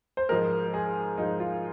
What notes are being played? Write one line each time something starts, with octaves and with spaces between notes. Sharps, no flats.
C5
G#2 F3 G#3 A#4
G#4
G#2 F3 G#3 D#4
F4